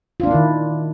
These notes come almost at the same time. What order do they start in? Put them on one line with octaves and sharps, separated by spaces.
F4 D4 A#3 E4 D#3